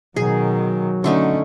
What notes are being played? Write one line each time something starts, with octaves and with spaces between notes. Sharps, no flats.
B2 D#3 F#3 G#4
D3 A3 C#4 D#4